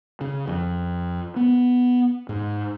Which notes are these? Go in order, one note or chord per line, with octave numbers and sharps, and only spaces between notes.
C#3
F2
B3
G#2